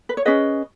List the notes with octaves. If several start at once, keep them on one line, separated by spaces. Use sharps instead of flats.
B4
C#5
C#4 G#4 B4 D#5